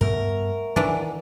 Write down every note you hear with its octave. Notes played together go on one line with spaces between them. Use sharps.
G2 A3 B3 A#4 E5 F#5 C#6
D#3 E3 D4 D#4 F#5 G#5